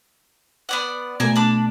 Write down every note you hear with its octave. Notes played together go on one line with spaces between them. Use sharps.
B3 D5 F#5
B2 A3 A#3 G#5
D4 B5 D6